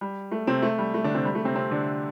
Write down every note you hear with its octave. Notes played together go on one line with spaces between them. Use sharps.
G3
A3
C3 C4
A3
G3
A3
D3 D4
C3 C4
G3
A3
C3 C4
C3 C4
D3 D4